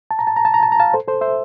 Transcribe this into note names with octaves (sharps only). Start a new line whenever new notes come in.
A5
A#5
A5
A#5
A5
A#5
A5
A#5
F5 A5
A4 C5
A4 C5
C5 E5